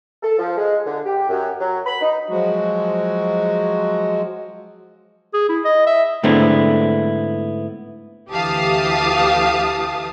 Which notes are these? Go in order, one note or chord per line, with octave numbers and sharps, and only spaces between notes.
A4
F3
G#3
D3
G4
F#2
F#3
B5
D#4
F3 F#3 G#3 F#4
G#4
E4
D#5
E5
G#2 D3 A3 B3 C4 E4
D2 E3 G4 F5 A5 D#6